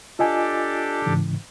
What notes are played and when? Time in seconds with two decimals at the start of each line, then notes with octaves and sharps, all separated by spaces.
0.19 D4 F4 G4 A4 D#5 G#5
1.06 G#2 C#3 E3